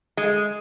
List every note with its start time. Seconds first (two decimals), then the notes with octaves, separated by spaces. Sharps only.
0.17 G#3